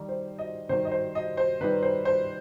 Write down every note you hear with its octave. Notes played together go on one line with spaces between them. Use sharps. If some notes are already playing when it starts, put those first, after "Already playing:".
Already playing: D#3 G3 D#4
C5
D#5
D#3 G3 D#4 C5
D#5
C5
D#5
C5
D#3 G3 D#4 B4
C5
C5